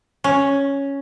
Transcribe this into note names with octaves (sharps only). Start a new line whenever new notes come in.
C#4